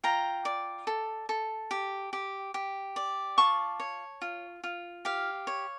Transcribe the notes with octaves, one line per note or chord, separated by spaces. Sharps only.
F4 G5 A#5
D5
A4
A4
G4
G4
G4
D5
F4 A5 C#6
C#5
F4
F4
G4 F5
C#5